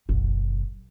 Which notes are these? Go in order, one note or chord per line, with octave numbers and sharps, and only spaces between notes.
F#1 B1